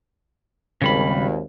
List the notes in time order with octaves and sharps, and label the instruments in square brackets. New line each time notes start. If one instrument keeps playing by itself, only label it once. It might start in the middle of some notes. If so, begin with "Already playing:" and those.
[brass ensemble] G#1 D#2 [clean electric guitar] C#3 G3 B5